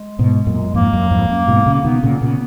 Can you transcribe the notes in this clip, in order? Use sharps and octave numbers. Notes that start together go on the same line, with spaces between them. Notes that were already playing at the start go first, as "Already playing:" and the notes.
Already playing: G#3
G#2 B2
F#2 A#2
F2 G#2 A#3
F#2
F2 G#2
F#2
G#2 B2
A#2 C#3
A#3
B2 D#3 B3
A#2 C#3 A#3
B3
A#2 C#3